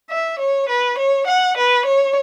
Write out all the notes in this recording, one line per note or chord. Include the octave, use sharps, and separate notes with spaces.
E5
C#5
B4
C#5
F#5
B4
C#5